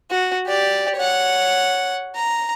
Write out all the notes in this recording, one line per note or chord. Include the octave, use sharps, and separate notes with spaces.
F#4
G4 D5
C#5 F#5
A#5